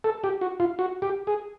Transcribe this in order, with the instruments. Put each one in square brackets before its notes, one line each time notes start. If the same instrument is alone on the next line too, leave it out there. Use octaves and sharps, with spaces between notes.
[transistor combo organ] A4
G4
F#4
F4
F#4
G4
G#4